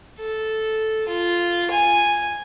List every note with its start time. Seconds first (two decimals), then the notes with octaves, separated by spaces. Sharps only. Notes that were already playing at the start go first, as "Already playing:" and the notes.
0.19 A4
1.08 F4
1.70 G#5